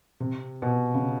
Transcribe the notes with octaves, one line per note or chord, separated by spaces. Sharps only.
C3
B2
C#3